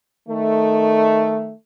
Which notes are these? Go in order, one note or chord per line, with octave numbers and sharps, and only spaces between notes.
D#3 A3